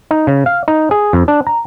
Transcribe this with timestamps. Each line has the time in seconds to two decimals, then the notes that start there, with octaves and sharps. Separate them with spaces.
0.11 D#4
0.27 C#3
0.46 F5
0.68 D#4
0.91 G#4
1.13 F2
1.28 D4
1.47 A#5